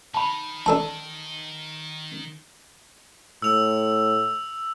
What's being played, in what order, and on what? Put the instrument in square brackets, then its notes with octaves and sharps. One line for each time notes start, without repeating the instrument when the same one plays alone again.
[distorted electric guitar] D#3 [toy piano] A5 B5
[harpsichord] D4 A4 A#5 [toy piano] A5
[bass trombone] A2 [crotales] E6 F7